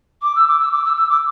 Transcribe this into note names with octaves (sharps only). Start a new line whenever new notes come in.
D6
E6
D6
E6
D6
E6
E6
D6